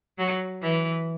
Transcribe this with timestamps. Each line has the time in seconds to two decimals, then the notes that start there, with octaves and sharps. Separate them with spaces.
0.18 F#3
0.62 E3